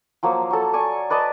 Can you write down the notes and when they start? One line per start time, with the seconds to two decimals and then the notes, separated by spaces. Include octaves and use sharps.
0.23 F3 F#3 A#3
0.51 F#3 A4
0.73 D5 G#5 C#6
1.10 B4 D5 D#5 A5